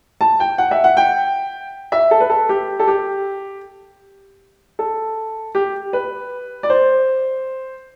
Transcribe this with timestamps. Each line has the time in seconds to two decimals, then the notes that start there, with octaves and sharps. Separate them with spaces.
0.21 A5
0.40 G5
0.58 F#5
0.71 E5
0.84 F#5
0.97 G5
1.92 E5
2.11 A4
2.20 B4
2.30 A4
2.49 G4
2.79 A4
2.87 G4
4.79 A4
5.55 G4
5.93 B4
6.63 D5
6.70 C5